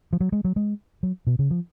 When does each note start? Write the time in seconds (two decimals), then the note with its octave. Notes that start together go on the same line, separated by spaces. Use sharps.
0.13 F3
0.20 F#3
0.32 G#3
0.44 F#3
0.56 G#3
1.03 F#3
1.27 B2
1.39 C#3
1.51 F3